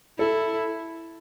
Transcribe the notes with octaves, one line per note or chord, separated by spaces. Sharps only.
E4 A4